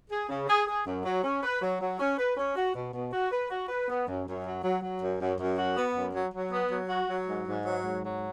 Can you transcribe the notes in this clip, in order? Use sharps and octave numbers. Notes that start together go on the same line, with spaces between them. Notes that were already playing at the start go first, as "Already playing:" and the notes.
G#4
C#3
G#4
G#4
F#2
F#3
C#4
B4
F#3
F#3
C#4
B4
C#4
F#4
B2
B2
F#4
B4
F#4
B4
B3
F#2
F#2
F#3
F#3
F#3
F#2
F#2
F#2
F#4
B3
F#2
F#3
F#3
B3
F#3
F#4
F#3
G#2
G#2
F#3
G#2
F#3